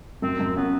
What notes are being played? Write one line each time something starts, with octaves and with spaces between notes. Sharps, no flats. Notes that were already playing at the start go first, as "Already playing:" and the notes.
F#2 C4
F#2
B3 C#4